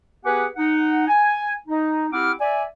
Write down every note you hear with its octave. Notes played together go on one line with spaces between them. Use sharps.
B3 G4 G#4 B4 F#5 G#5
D#4 F#5
G#5
D#4
C4 E4 G4 F#5 D6 F6
D5 E5 G#5